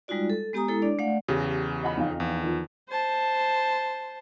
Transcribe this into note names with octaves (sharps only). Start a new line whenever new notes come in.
G3 G#3 D#4 F4 F#4 D5
A4
G#3 B3 G4 G#5 A#5 D#6
G#3 E4 A4 C#5
D4 D5
A3 D5 F5 F#5
E2 C#3 G4 A#6
D#5 F#5 B5
F2 D#4 F5
E2
D#3 F3
C5 A5